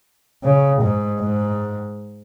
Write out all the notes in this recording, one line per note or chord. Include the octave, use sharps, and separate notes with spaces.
C#3
G#2
G#2